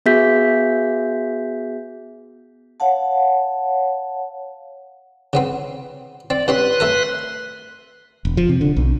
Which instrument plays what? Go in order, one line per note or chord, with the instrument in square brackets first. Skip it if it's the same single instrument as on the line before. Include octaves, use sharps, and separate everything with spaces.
[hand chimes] B3 F#4 G#4 E5 G6 B6
[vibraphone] C#5 F5 F#5 A5
[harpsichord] C#3 B3 C4
[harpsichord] C4 [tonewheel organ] D5
[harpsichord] G2 C4 C#4 [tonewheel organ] B4 C6 F#6
[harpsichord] A3 A4 A#4
[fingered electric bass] E1
F3
C3
D3
B1